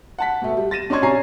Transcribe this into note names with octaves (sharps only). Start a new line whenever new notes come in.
F#5 A5 B6
B2 A3
G3
A6 A#6 D#7 E7
C#4 D4 D#5 C6 C#6 G#6
C3 C#4 G#5 A#5 C7